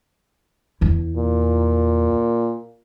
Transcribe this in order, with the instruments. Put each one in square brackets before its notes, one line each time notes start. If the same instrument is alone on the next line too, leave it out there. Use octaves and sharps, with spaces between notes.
[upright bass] E2 E4
[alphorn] A#2